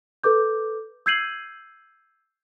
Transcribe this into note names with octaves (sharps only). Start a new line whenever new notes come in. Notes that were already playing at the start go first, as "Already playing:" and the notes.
A4 B4 D6 G6
E6 G6 G#6 C7 D#7 F#7